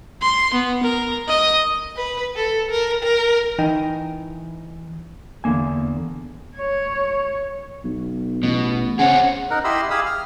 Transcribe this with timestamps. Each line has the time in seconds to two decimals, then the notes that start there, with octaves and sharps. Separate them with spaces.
0.22 C6
0.54 B3
0.83 A#4
1.28 D#5
1.97 B4
2.36 A4
2.71 A#4
3.03 A#4
3.58 E3 D#4 D#5 G5
5.44 E2 D3 A#3 G#5
6.57 C#5
7.84 B1
8.43 A1 B2
8.99 C#3 C4 C#4 G#4 F#5
9.50 D#4 A#4 F#5
9.64 E4 G4 D#5 B5 C6 E6
9.90 G4 G#4 F5 B5 D#6 E6
10.06 F6